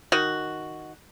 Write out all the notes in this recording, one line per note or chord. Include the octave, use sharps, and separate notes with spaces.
D#3 F#4